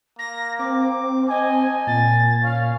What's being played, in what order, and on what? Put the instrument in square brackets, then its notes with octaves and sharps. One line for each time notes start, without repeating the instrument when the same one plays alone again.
[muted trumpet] A#3 [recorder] A#6
[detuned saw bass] C4 [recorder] D6
[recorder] D#5 [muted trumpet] G#5
[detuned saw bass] A#2 [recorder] A6
[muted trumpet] C#4 [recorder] F5